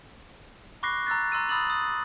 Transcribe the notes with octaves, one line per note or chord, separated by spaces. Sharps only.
B5 C#6 D6 F#6 A#6 C7
A#5 E6 F#6 A6
A#5 C6 E6 D#7
B5 D#6 E6 A6 F#7
D#6